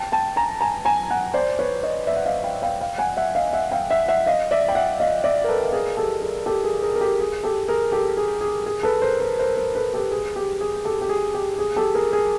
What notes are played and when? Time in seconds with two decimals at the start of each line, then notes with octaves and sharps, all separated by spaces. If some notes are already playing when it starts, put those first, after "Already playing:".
Already playing: G5 A5
0.12 G5 A5
0.36 G#5 A#5
0.61 G#5 A#5
0.85 G#5 A#5
1.10 F#5 G#5
1.34 C5 D5
1.59 B4 C#5
1.83 C#5 D#5
2.07 D5 E5
2.16 F#5
2.26 D#5 F5
2.44 F5 G5
2.62 F5 G5
2.81 F5 G5
2.98 F#5 G#5
3.17 E5 F#5
3.35 D#5 F5
3.53 E5 F#5
3.71 F5 G5
3.91 E5 F#5
4.08 E5 F#5
4.27 D#5 F5
4.51 D5 E5
4.68 G5
4.75 E5 F#5
5.00 D#5 F5
5.24 D5 E5
5.44 A#4
5.49 A4 B4
5.73 G#4 A#4
5.97 G4 A4
6.21 G#4 A#4
6.46 G4 A4
6.64 G#4 A#4
6.82 G#4 A#4
6.95 A#4
7.01 G4 A4
7.20 G#4
7.44 G4 A4
7.68 G#4 A#4
7.92 G4 A4
8.17 G#4
8.41 G#4
8.66 G#4
8.83 A4 B4
9.02 A#4 C5
9.20 A#4 C5
9.39 A#4 C5
9.57 A#4 C5
9.75 A4 B4
9.94 G4 A4
10.11 G#4
10.36 G4
10.61 G#4
10.85 G4 A4
11.01 G4
11.09 G#4
11.34 G4
11.59 G#4
11.76 G4 A4
11.95 G#4 A#4
12.12 G#4 A#4